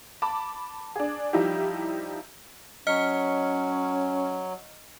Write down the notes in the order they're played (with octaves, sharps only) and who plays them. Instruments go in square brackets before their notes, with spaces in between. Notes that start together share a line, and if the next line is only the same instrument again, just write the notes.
[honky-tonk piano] A5 B5 D6
D4 G#4
F3 G3 D#4 E4 G4
[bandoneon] F#3 [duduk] C#4 [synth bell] D#5 F6 C#7